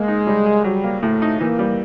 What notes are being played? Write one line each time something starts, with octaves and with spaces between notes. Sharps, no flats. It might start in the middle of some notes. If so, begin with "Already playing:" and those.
Already playing: G#3 A#3
D#4
G3
G#4
F#3 G3
A#3
A2 A3
D#4
E3 A#3
G3